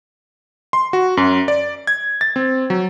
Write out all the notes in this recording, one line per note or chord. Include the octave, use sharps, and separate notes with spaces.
C6
F#4
F#2
D5
G#6
A6
C4
F#3